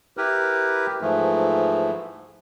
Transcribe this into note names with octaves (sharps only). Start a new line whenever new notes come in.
E4 G4 A#4 B4
G#2 E3 F3 A3